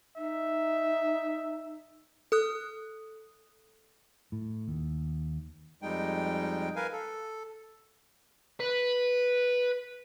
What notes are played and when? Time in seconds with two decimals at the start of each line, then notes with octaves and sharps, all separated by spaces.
0.17 D#4 E5
2.32 A4 D#6 F#6
4.32 A2
4.68 D#2
5.82 F2 G3 G#3 D#4 G5
6.76 A#4 B4 F5 G#5
6.93 A4
8.60 B4